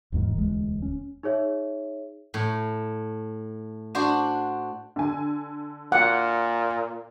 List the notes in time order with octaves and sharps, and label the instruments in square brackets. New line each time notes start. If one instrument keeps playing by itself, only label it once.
[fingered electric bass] E1 E2 G#2 D#3
E1 D2 G#3
C#4
[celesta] D#4 G#4 C#5 E5
[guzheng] A2
D4 F#4 C5
[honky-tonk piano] D3 G#5
[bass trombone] A#2 [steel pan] F#5